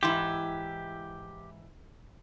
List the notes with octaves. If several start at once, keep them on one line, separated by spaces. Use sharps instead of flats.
G#2 E3 E4 G4